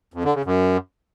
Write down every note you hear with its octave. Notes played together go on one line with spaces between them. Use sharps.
F2
D3
C#3
F#2